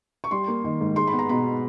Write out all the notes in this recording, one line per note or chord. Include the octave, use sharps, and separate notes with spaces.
C#6
G3 C6
A#3
D#3
G#2
G#3 C6
B5
B3
A#5
B2 B5